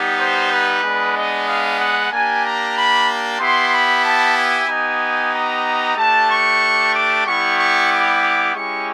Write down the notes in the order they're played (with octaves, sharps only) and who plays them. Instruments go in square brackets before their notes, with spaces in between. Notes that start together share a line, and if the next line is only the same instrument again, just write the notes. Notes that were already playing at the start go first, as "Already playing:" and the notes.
Already playing: [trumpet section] G3 B3 D#4 G4
C5
B4
G#3 B3 D4
D#5
F5
F#5
A#3 D4 G4 G#5
A#5
B5
B3 E4 G4 C6
B5
A5
G#5
B3 D#4 G4
A#5
A3 D4 G4 A5
C#6
D6
G3 B3 E4 G4 C#6
C#6
D6
G#3 C#4 E4 G4 C#6